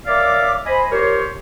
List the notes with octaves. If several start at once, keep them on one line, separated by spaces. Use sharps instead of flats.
A#4 C#5 D5 E5 F5 D6
C5 D#5 G#5 B5
F4 G4 A#4 C5 C#5